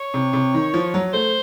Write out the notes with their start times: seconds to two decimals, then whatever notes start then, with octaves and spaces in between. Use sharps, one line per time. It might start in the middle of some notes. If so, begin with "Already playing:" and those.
Already playing: C#5
0.14 C3
0.33 C3
0.54 D#3
0.74 F3
0.94 F#3
1.13 A3 C5